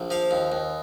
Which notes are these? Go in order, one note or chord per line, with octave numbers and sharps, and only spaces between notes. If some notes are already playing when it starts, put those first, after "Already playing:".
Already playing: A#1
F3 F5
D#2
D#2